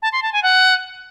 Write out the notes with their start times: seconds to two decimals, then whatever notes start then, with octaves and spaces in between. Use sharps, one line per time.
0.02 A5
0.12 C6
0.23 A5
0.33 G#5
0.43 F#5